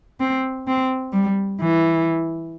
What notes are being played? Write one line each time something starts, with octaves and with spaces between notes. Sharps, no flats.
C4
C4
G3
E3